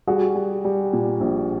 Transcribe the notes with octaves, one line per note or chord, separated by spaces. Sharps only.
G3 F#4 G#4
G3
G3
A#2
A#1